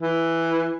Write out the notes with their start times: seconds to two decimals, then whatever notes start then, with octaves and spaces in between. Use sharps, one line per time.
0.01 E3